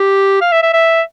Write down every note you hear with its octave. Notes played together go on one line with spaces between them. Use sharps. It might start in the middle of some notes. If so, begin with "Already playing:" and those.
Already playing: G4
F5
E5
E5
E5